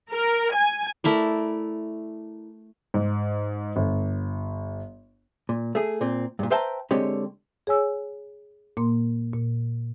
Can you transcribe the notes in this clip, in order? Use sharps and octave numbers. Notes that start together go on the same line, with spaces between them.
A#4
G#5
A3 E4 A#4 D5
G#2
G1
A#2
A3 G#4
A#2 C4
G2 A#2
B4 C5 E5 G5 A5 A#5
D3 G#3 C4 G4 C#5
G#4 C#5 G#5 E6
A#2 A#3 C6
A#2